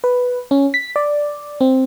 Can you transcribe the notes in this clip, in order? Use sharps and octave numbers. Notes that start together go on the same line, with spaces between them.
B4
C#4
B6
D5
C4